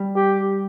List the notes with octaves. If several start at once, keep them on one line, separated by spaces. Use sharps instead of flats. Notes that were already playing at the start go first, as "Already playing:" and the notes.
Already playing: G3
G4